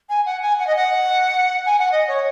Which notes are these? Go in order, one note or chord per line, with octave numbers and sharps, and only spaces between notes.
G#5
F#5
G#5
F#5
D#5
F#5
G#5
F#5
D#5
C#5